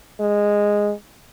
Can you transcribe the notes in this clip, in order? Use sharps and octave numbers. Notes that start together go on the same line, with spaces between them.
G#3